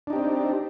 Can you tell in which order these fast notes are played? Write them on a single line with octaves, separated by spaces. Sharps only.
D4 D#4 G4 C4